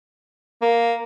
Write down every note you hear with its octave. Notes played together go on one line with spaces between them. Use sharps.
A#3